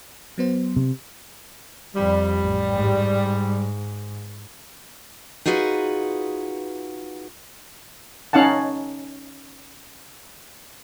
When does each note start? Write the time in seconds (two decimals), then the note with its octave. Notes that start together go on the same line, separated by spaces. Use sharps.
0.38 F#3 B3 C5
0.76 C3
1.95 F2 G3
2.40 A1
2.71 G#2
5.46 D#4 F4 F#4 G#4 B4
8.33 C#4 D#4 F5 F#5 A5